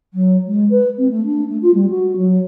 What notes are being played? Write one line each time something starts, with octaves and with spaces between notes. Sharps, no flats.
F#3
G#3
B4
C4
A3
D4
A3
F4
G3
F#4
F#3